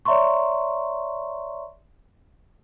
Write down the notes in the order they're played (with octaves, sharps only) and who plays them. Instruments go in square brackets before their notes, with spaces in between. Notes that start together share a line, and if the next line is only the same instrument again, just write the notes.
[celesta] C#5 D5 E5 A#5 C6 C#6